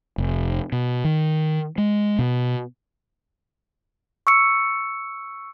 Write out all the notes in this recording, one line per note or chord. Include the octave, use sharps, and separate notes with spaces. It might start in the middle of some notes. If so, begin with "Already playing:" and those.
F1
B2
D#3
G#3
B2
C#6 E6 C#7